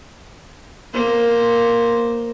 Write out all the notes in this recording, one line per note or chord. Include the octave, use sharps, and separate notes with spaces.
A#3 C5